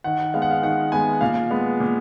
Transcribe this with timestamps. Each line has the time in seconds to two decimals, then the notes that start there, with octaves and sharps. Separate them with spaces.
0.04 D#3 F#5
0.34 G#3 B3 F5
0.42 F#5
0.51 F5
0.63 D#3 F#5
0.92 G#3 B3 G#5
1.21 A#2 F5
1.50 G#3 B3
1.80 A#2